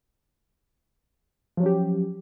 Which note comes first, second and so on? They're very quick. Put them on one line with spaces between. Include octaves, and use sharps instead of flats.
F3 F#3 C#4 G4